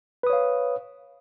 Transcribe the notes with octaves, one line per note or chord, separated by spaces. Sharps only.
B4 C#5 F5 D#6